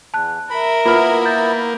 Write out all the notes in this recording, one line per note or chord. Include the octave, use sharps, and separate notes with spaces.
E2 A5 F#6
A#4 E5 B5
A#3 B3 E4 F4 B4 B5 F6
G6 A6